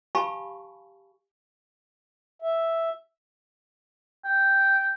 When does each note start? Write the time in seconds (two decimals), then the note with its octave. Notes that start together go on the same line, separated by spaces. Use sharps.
0.15 G4 F5 G#5 A5 B5 C#6
2.42 E5
4.25 G5